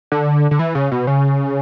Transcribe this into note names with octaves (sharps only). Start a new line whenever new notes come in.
D3
D3
E3
C#3
B2
C#3